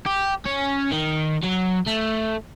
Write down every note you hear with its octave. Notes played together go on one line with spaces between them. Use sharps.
G4
C#4
D#3
F#3
A3